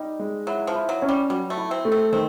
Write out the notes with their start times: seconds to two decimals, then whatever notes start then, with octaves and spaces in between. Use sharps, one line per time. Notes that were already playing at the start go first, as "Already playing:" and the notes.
Already playing: G3 D#4
0.19 G#3
0.47 F#3 E4
0.67 F3
0.75 E4
0.89 F#3
1.02 C#4
1.09 G3
1.30 F#3 G3
1.50 A3
1.57 E4
1.71 C4
1.85 A3
1.92 C4
2.13 D#3 C4